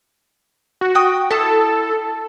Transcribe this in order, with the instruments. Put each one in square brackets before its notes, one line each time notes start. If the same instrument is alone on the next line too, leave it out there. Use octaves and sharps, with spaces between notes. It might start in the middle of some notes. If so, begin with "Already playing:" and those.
[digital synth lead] F#4
[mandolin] G5 D#6
[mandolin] E4 A5 [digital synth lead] A4